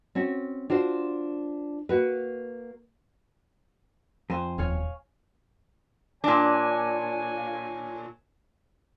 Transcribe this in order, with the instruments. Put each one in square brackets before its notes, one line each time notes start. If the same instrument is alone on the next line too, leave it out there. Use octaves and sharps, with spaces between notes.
[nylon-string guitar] C4 C#4 F#4
D4 F4 F#4 C5
A#3 F#4 B4
[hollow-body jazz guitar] F2 [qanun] C5 G#5
[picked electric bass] D#1 [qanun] C#5 F5 G#5
[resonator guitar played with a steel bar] A#2 D4 [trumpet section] C#5 G#5